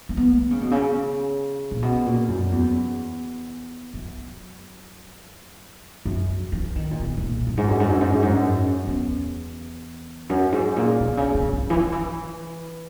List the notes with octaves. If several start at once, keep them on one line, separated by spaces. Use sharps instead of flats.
A#3
B3
D#3
C#3
B2
C#3
A#2
B2
A#2
F#2
E2
F#2
F#2
E3
D#3
A#2
B2
B2
A#2
F#2
G#2
F#2
G#2
F#2
G#2
F#2
G#2
F#2
E2
F#2
G#2
A#2
B2
C#3
C#3
C#3
E3
D#3
E3